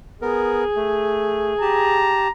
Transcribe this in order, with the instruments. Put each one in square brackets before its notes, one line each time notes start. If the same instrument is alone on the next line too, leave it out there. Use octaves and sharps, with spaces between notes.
[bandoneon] B3 A#4 [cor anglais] G#4
[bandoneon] A3
[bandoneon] G4 A5 [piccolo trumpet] A#5